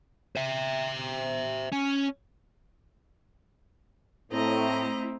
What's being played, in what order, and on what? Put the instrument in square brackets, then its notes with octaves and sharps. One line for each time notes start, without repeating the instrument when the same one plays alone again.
[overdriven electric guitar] C5 E5
C#4
[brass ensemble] A2 [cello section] A3 E4 [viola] C4 [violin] D#5 A#5